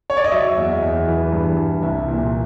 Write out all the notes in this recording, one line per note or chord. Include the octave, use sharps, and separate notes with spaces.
C#5
D5
D#5
F#3 E5
E2
E2
E3
G2
E3
C2 E5
A#2